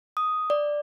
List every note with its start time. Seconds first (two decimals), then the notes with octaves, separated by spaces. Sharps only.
0.17 D#6
0.50 D5